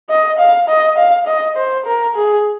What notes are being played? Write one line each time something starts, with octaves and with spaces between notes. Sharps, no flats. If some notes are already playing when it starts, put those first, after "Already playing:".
D#5
F5
D#5
F5
D#5
C5
A#4
G#4